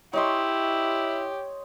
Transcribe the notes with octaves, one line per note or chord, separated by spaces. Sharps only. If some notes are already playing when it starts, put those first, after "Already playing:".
E4 G4 C#5 D#5 C6